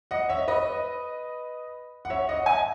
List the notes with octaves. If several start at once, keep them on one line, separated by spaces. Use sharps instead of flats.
D#5 F#5
C#5 E5
B4 D#5
F#5
C#5 E5
D#5 F#5
E5 G#5